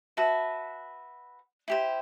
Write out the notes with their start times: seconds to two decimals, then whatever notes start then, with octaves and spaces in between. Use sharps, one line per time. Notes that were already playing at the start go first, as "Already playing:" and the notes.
0.17 F#4 B4 E5 A5
1.68 E4 G4 C5